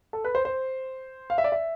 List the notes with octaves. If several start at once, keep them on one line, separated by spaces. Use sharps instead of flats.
A4
B4
C5
C5
F5
E5
D5
E5